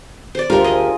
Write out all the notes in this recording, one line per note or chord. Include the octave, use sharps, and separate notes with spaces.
C5 D5
D2 F4 G4 A#4
G#4 D#5